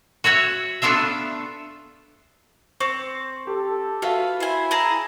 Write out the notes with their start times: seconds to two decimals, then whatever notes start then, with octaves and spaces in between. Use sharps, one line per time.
0.24 F#4 C#5 E5 F#5
0.82 A3 B3 D4 F4 E5
2.80 C4 C5 C#6
3.47 G4 A4
4.02 F4 F#4 B4 E5 F5
4.40 E4 C5 G#5
4.71 G#4 A5 A#5